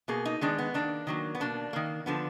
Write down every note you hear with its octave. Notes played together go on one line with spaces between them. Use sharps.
B2 A#3 G#4
D#4
D#3 G#3 B3 D4
B3
D#3 A#3 D4
D#3 F#3 A#3
B3
B2 A#3 D4
D#3 A#3
D3 F3 B3